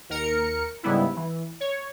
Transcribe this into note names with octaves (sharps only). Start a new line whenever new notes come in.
D#2 A#4 C#7
G#2 C#3 G3 B3 E4
E3
C#5